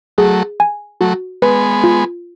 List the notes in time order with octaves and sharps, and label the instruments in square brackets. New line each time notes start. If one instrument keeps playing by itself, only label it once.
[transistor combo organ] F#3 A3 [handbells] G#4
[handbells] G#5
[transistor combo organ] F#3 A3 [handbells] F#4
[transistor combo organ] G#3 B3 [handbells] B4
[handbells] F4